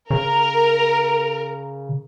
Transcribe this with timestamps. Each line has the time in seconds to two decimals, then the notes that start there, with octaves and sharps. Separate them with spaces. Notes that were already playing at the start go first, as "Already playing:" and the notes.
0.11 C#3 A#4